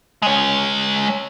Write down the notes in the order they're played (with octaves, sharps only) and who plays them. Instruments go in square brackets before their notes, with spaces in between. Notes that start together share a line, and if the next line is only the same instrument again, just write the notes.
[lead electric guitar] G#3 C#5